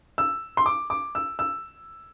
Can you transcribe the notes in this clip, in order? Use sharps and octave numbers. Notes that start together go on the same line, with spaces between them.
E6
C6
D6
D6
E6
E6